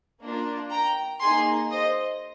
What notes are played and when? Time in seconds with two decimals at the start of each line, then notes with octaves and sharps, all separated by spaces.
0.21 A#3 D4 F4
0.70 G5 A#5
1.20 A#3 D#4 G#4 G#5 C6
1.70 C5 D#5